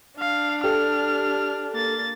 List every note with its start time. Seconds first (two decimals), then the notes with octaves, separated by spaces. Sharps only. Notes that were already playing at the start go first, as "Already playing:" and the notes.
0.20 D4 F5
0.64 G4 A4 F6
1.73 A#3 A6